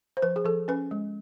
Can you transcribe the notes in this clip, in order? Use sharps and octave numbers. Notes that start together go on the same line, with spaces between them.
C5
F3 B4
G#4
F3 A4
C#4 B4
G#3